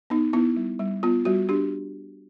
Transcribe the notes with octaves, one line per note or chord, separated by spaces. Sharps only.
B3 D#4
B3 E4
G3
G3
B3 F4
G3 F#4
D4 G4